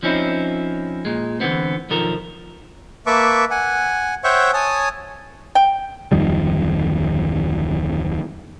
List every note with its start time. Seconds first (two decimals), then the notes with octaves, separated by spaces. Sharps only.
0.03 F3 C4 C#4 D#4 E4
1.05 A#2 G#3
1.40 D3 E3 F#3 G#3 B3 C4
1.90 B1 D#3 F3 A4 A#4
3.06 A#3 B4 E5 A5 C#6 D6
3.51 F#5 G#5
4.24 C5 C#5 E5 F#5 G5 C#6
4.54 C#5 G#5 A5 D#6
5.55 G5
6.12 D1 F2 D#3 G3